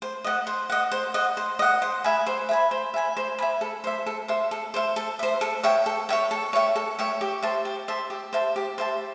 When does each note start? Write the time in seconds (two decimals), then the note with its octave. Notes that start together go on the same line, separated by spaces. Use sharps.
0.02 C5
0.24 D#5 F#5
0.47 C5
0.70 D#5 F#5
0.92 C5
1.14 D#5 F#5
1.37 C5
1.59 D#5 F#5
1.82 C5
2.04 E5 G#5 B5
2.26 C5
2.49 E5 G#5 B5
2.71 C5
2.94 E5 G#5 B5
3.17 C5
3.39 E5 G#5 B5
3.61 A4
3.84 C5 E5
4.06 A4
4.28 C5 E5
4.51 A4
4.74 C5 E5
4.96 A4
5.19 C5 E5
5.41 A4
5.63 C#5 E5 G5
5.86 A4
6.09 C#5 E5 G5
6.31 A4
6.53 C#5 E5 G5
6.76 A4
6.99 C#5 E5 G5
7.21 G4
7.42 C5 E5 A5
7.65 G4
7.88 C5 E5 A5
8.10 G4
8.33 C5 E5 A5
8.56 G4
8.78 C5 E5 A5